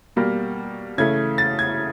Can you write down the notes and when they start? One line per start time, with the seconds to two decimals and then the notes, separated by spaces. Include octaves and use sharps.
0.16 B2 G3 A#3
0.98 C#3 E3 A3 G#6
1.38 A6
1.59 G#6